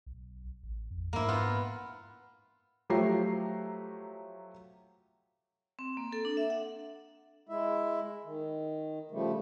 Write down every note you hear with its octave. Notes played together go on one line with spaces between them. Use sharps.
B1
A1
F2
G#2 A#3 E4
B3 F4
F3 F#3 A3 G4 A#5 C7
C4
A#3
A4
D4
E5
F#5
G#3 E4 E5
D#3
C#3 F3 G3 A3